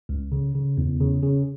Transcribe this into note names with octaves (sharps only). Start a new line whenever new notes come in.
C#2
C#3
C#3
E2
C#3
C#3